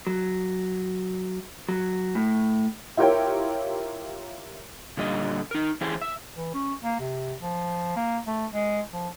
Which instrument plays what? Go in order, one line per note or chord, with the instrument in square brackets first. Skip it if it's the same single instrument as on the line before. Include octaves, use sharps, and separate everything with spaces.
[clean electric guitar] F#3
F#3
A2
[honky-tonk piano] E4 F4 G4 A#4 C#5 G5
[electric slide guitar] A#2 D3 G3 D#5
D#4 A#4
E3 E4 G#4 C5 E5 G5
E5
[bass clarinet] E3
C#4
A#3
C3
F3
A#3
A3
G#3
F3